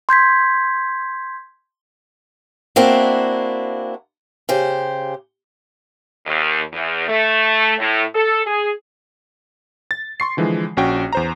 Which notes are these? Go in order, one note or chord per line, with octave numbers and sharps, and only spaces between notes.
C6 G6 G#6 B6
A#3 C4 D4 E4 F#4
C#3 G4 C5
D#2
E2
A3
A2
A4
G#4
A6
C6 C#6 C7
D3 E3 F3 G#3
A#1 C#4 F#4 G5
E2 C5 A#5